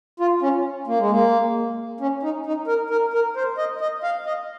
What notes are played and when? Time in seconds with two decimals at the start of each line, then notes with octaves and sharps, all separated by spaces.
0.20 F4
0.42 C#4
0.87 A#3
0.99 G#3
1.11 A#3
2.00 C#4
2.23 D#4
2.46 D#4
2.67 A#4
2.90 A#4
3.14 A#4
3.36 C5
3.58 D#5
3.81 D#5
4.03 F5
4.26 D#5